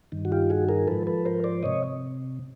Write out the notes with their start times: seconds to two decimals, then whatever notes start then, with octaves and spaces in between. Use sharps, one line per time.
0.12 G2 D#3
0.25 F#4
0.32 F4 G4
0.50 F#4 G#4
0.69 G#4 A#4
0.87 G#2 F3 A4 B4
1.07 A4 B4
1.25 A#4 C5
1.44 C5 D5
1.63 C3 C#5 D#5